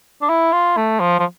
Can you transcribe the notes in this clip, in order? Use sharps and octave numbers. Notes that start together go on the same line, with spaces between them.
D4
E4
F4
A3
F3
F3